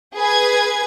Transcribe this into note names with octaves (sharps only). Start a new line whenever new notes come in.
G#4 B4 G#6